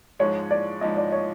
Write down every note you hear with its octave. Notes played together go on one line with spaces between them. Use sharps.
G#2 F3 G#3 C#5
D5
G#2 F3 G#3 D#5
D5
C#5